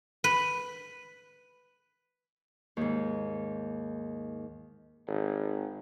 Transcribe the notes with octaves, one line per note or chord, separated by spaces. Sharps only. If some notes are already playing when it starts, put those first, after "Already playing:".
B4
D#2 G#2
G#1